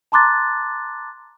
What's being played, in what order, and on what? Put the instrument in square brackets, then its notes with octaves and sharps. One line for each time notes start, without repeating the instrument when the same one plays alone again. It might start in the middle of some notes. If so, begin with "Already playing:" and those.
[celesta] A5 A#5 C6 D6 F#6 A6